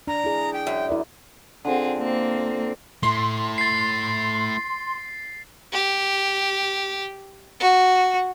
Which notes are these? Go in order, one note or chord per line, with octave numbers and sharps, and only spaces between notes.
D4 A#5
E4 G#4
G5
F#2
E4 A#4 D5
D3 C4 F4 G#4
A#3 C4
A3 E4 C6
A6 C7
G4
F#4